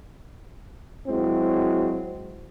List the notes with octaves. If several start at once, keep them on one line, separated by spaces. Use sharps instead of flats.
F#3 G#3 C4 E4